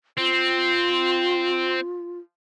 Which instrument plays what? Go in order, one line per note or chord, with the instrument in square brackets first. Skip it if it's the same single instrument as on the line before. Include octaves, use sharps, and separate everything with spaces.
[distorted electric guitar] C4 [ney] F4